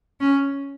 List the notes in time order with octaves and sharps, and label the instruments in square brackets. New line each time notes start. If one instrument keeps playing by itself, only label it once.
[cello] C#4